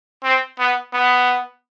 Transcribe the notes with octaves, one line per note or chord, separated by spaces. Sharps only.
C4
B3
B3